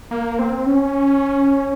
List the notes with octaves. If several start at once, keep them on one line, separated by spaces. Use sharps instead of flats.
A#3
C4
C#4